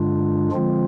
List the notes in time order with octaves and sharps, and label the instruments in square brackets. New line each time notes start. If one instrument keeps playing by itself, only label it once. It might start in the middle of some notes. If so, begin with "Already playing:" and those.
Already playing: [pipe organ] G2 D3 G#3 D4 F4
D3 F3 G#3 C4 F4